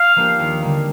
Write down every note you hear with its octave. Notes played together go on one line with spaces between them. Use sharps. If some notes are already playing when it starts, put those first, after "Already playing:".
Already playing: F5
F3 A#3 D4 G4
D#2
D3 G3 A#3